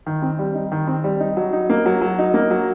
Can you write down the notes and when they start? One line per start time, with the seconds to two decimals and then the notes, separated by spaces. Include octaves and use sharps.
0.06 D#3
0.22 C4
0.39 G3
0.55 D#4
0.72 D#3
0.87 C4
1.04 G3
1.20 D#4
1.37 F#3
1.53 D#4
1.70 A#3
1.86 F#3
2.01 F#3
2.19 D#4
2.34 A#3
2.51 F#3